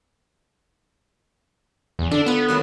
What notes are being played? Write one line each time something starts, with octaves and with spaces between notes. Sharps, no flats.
E2
D3 D4
B3 F4 B4
D#3 F#3 A3